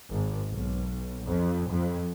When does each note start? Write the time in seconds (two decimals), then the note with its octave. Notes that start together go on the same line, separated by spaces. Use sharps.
0.10 G#1
0.50 B1
1.25 F2
1.69 F2